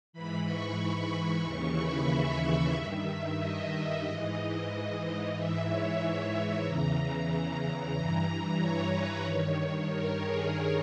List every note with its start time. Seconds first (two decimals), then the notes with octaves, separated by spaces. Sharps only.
0.13 G#2 E3 B5
0.45 C#6
0.78 B5
1.43 D#2 C#3 E3 C#6
1.76 B5
2.09 E5
2.73 G2 D#3
3.38 D#5
4.04 G#2 E3 D#5
5.34 G#2 E3 E5
5.66 C#5
5.99 C#5
6.64 E2 C#3 E3 A#5
7.95 G2 E3 A#5
8.59 C#5
8.92 B4
9.25 G2 D#3 C#5
9.57 C#5
9.89 A#4
10.23 G#4